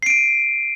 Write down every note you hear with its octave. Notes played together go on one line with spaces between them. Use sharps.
C7 D7 D#7